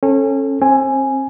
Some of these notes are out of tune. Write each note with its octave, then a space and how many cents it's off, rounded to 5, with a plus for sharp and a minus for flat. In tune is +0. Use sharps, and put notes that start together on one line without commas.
C#4 -25 A4 +0
C4 +35 G#5 +0